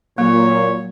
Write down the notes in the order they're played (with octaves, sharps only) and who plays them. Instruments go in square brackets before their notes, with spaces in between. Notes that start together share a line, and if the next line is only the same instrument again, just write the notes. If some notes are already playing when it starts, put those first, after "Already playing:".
[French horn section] A#2 [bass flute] F#3 [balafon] A#3 [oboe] C#5